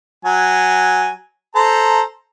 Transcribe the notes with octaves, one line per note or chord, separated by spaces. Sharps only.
F#3 G#5
A4 C5 A#5